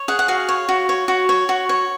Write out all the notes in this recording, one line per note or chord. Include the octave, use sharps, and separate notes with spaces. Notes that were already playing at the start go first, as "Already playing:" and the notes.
Already playing: C#5
G#4 F#5
F#5
F#4 F5
C#5
F#4
C#5
F#4
C#5
F#4
C#5